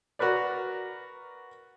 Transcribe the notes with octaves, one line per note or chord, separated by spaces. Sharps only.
F#4 A#4 B4 D5